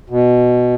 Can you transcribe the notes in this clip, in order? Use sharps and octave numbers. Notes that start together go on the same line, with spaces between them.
B2